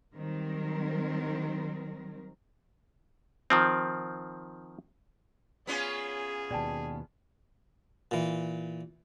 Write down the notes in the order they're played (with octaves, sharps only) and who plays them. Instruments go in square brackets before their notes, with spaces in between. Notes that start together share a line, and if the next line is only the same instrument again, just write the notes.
[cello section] D#3 F#3 G3 C4 A#4
[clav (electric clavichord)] D#3 F3 C4
[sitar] B3 C#4 F4 [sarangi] G#4
[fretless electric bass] D#2 B2 [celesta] D5 G5 A5
[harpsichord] A#2 E3